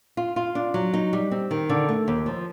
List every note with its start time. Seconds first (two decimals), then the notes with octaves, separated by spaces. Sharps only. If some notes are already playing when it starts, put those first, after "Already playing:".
0.17 F4
0.36 F4
0.55 D4
0.74 F#3
0.94 D#4
1.13 G3
1.31 C4
1.51 D#3
1.69 D3
1.89 A3
2.08 D#2
2.26 F3